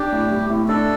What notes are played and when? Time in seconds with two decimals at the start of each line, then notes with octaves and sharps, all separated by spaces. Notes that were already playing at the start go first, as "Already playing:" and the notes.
Already playing: D4 G4
0.12 A2
0.31 G3
0.50 A2
0.68 D4 A4